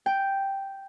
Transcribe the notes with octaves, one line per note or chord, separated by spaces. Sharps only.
G5